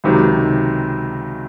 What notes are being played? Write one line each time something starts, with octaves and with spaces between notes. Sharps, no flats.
C#2 C3 D#3 F#3